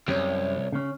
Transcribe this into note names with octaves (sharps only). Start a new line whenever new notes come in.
C2 F#2 C3 C#5
C#3 C#4